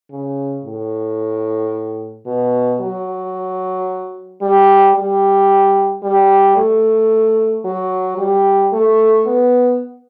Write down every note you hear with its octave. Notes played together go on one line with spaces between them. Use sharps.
C#3
A2
B2
F#3
G3
G3
G3
A3
F#3
G3
A3
B3